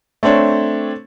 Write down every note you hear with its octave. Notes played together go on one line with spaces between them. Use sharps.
A3 C4 D4 C#5